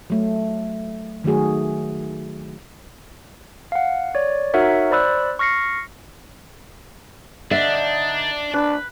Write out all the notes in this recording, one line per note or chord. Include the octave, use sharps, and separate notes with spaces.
F#3 A3
D#3 F#3 A3 F#4 G#4
F5 F#5
C#5 D5
D#4 F#4 A#4 C#5 E5 F#5
C5 D5 B5 E6 F#6
C#6 F6 A#6 C7 C#7
D3 D4 D#4 E5
D4 B4